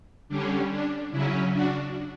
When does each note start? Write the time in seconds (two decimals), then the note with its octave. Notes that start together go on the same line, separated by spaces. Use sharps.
0.29 D3 G3 C#4 D4
0.70 D4
1.11 C#3 F#3 C#4 E4
1.53 D4 F#4